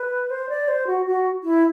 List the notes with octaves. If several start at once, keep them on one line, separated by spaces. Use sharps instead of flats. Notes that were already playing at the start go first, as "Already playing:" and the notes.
Already playing: B4
C5
D5
C5
F#4
F#4
E4